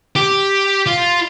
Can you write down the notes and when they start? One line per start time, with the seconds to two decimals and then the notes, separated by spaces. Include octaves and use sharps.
0.16 G4
0.87 F4